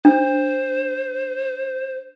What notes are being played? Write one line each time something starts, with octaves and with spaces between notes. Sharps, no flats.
D4 C5